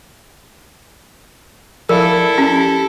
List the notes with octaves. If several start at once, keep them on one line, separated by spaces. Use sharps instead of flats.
F3 E4 A4 A#4 D5 F5
C#4 G4